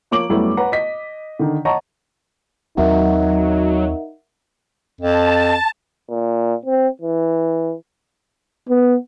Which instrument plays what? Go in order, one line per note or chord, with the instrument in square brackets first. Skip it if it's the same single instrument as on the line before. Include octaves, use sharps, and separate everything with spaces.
[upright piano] F3 A#3 C#5 D6 D7 F#7
F#2 G3 A3 B3 E4
B4 C#5 F#5 A#5
D#5 B6
D3 D#3
C#5 D#5 F#5 A5 A#5 C#6
[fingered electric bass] D#2 C4 [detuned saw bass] F#3 [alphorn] D#4 [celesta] A#4 E5 F#5
[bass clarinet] F2 [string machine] A5
[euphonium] A#2
C4
E3
B3